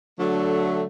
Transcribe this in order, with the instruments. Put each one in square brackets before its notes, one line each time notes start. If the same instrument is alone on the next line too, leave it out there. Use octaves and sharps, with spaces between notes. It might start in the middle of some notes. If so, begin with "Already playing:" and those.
[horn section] D3 A3 [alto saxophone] F#3